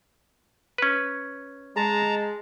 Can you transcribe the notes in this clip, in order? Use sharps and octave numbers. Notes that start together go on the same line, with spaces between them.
C#4 B4
G#3 A5 A#5